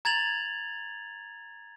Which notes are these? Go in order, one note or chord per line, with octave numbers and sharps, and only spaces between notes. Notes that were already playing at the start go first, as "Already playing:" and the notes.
A#5 G#6 A6 F7 F#7